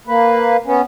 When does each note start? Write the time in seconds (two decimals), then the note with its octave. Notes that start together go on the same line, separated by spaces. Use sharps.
0.07 A#3 B4
0.66 B3 C#4